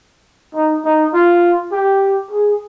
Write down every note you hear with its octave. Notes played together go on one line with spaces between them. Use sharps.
D#4
D#4
F4
G4
G#4